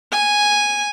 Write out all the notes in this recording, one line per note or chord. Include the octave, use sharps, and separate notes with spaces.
G#5